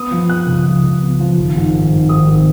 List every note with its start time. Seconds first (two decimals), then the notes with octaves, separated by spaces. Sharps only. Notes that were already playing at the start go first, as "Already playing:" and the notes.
Already playing: B3 D#6
0.11 F3
0.29 F3 F#6
0.47 C#2
0.65 F3
0.83 C#2
1.01 B3
1.20 F3
1.37 G#1
1.56 G#2
1.73 G#1
1.92 G#2
2.09 G#1 D#6
2.27 G#1